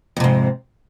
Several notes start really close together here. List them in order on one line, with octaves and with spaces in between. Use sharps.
F2 C3 G#2